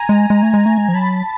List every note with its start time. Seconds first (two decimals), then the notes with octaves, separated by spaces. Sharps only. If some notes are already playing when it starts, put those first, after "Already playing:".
Already playing: G#5 A#5
0.09 G#3
0.30 G#3
0.43 A3
0.54 G#3
0.66 A3
0.78 G#3
0.88 F3
0.93 F#3 A5 B5